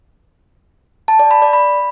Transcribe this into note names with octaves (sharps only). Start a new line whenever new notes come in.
A5
D5
B5
D5
B5